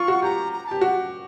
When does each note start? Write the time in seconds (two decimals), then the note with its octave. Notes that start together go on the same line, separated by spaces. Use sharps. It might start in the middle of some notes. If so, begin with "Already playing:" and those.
Already playing: F4 C#6
0.08 F#4
0.22 G4 A#5
0.53 A#5
0.67 G4 A5
0.81 F#4